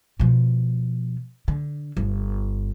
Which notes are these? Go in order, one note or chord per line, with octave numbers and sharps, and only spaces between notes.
B2 F3
D3
G1